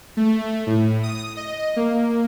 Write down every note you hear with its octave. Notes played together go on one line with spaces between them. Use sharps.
A3
A2
D#6
D#5
A#3